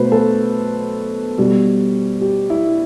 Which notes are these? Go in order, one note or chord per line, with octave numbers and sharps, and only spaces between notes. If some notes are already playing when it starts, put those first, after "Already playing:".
Already playing: B2 F#3 A3 B4 C5
A4
B2 G3
G4
E4